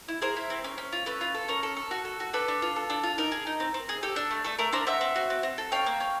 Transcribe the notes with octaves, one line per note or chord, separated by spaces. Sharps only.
E4
G#4 A#4 C5
E4
C4
C#4
C#4
F4
C#4 A4 B4
F4
A4
C#4 A#4
A4
A4
F#4
A4
F#4
D4 A4 B4
D4
F4
A4
D4
F4
D#4 A#4
G#4
D#4
C4
C4
G#4
G4 A4
D4
A3
A3 A4
A3 A#4
D4 A#4 C5
C4 E5 F#5
C4
F#4
C4
C4
A4
C#4 F5 G5
A#3
C#4